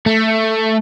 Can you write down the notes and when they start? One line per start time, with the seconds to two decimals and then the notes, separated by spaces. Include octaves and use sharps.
0.06 A3